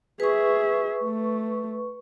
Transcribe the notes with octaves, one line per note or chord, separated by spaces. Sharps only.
G#4 B4 E5 C#6
A3